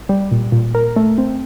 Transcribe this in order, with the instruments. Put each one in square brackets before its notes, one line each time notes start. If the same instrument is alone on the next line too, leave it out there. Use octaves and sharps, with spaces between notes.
[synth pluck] G3
A#2
A#2
A#4
A3
C4